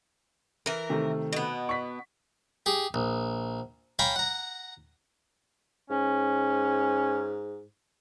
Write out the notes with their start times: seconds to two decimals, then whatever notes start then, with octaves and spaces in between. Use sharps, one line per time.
0.66 E3 A#4
0.90 C3 D#3 A3
1.33 B2 B3
1.69 C#6 B6
2.66 G4 G#4
2.94 A#1
3.99 C#5 F5 G5 G#5 A#5 B5
4.16 F#5 A#5
5.90 G#2 C#4